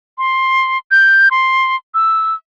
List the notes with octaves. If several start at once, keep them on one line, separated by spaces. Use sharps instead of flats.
C6
G6
C6
E6